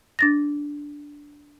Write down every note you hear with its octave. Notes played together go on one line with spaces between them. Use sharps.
D4 A6 A#6